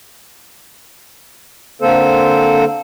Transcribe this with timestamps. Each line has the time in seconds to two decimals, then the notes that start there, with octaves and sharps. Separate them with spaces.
1.82 D3 A#3 C4 A4 C5